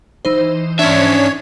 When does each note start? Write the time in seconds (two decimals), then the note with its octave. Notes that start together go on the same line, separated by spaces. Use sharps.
0.25 E3 D#4 C5
0.79 C#4 D4 C#5 E5 B6